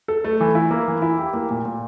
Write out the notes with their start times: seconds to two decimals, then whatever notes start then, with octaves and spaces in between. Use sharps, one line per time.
0.08 A4
0.25 A3
0.41 E3
0.55 E4
0.71 A#3
0.88 E3
1.02 E4
1.19 G4
1.34 A#3
1.50 A#2
1.65 A#2